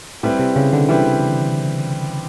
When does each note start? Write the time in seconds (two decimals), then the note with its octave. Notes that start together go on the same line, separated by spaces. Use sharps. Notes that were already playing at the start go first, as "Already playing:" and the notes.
0.23 A2 G3 C4 E4 G4 B4
0.39 C3
0.56 C#3
0.73 D3
0.89 E3 G3 C4 E4 G4 B4